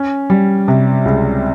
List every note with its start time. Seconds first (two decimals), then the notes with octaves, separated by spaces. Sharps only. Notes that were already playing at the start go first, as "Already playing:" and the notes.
Already playing: C#4
0.30 G3
0.68 C3
1.05 C#2